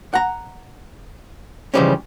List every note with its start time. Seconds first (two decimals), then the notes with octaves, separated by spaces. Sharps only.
0.14 F#5 A#5
1.74 C#3 E3 F3 G3 G#3 C#4